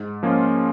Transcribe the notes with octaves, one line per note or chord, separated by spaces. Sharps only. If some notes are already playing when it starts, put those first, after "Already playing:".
Already playing: G#2
F3 A#3 C#4 F4